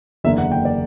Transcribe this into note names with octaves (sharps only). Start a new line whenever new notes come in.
F#1 E2 D3 A#3 D4 E5
F#5
G5
D5